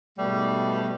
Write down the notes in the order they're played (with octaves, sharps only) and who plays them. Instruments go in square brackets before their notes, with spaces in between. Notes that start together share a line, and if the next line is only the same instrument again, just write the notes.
[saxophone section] G#2 B2 G3 A3